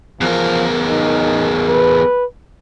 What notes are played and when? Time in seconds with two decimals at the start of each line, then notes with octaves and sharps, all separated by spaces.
0.21 E2 F3 A#4
0.88 D#4
1.69 B4